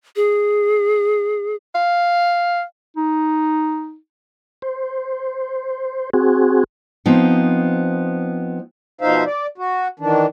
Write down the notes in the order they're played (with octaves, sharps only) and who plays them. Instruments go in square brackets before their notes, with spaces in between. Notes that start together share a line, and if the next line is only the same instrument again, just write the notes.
[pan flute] G#4
[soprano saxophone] F5
[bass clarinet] D#4
[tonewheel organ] C5
C4 F#4 G#4
[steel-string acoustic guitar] F3 B3 C4 D#4
[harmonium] B2 F3 D#4 C5 E5 F5
D5
F#4
D#3 E3 D4